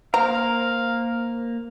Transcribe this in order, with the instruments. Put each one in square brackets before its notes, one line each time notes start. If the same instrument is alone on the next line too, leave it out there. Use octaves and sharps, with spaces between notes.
[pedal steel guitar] A#3 A#4 [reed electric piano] C5 [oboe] F5 [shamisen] A#5